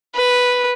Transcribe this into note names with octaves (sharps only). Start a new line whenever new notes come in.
B4